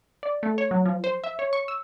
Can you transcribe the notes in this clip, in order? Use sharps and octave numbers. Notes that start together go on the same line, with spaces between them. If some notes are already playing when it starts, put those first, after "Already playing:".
D5
A3
C#5
F#3
F3
C5
E5
C#5
C#6
E6